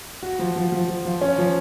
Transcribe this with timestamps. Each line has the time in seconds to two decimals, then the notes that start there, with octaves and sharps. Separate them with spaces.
0.23 F#4
0.39 F3
0.56 F3
0.72 F3
0.89 F3
1.05 F3
1.21 C#4
1.38 F3